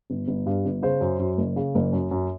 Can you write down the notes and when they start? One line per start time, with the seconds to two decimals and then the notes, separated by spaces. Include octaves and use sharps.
0.10 G1
0.28 G1
0.46 G2
0.65 G1
0.82 C#3 C5
1.01 F#2
1.19 F#2
1.38 F#1
1.56 C#3
1.75 F#1
1.92 F#2
2.11 F#2